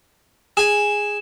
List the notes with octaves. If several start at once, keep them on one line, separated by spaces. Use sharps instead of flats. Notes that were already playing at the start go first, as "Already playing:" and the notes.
G#4 G#5 E7